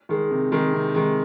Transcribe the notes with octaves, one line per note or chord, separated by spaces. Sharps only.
D#3 G#3
C3
D#3 G#3
C3
D#3 G#3